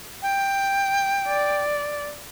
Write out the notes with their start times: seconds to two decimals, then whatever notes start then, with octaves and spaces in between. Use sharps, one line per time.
0.22 G5
1.28 D5